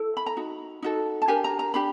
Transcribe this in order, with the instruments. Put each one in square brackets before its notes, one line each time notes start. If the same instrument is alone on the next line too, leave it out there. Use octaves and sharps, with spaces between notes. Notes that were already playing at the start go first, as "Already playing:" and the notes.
Already playing: [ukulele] E4 A4
B5
A#5
D#4 F#4
D#4 F#4 A4
A5
D4 G4 A#4 G#5
A#5
A#5
D4 G4 B5